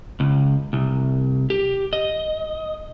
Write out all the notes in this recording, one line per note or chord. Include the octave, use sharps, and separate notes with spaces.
C#2
C2
G4
D#5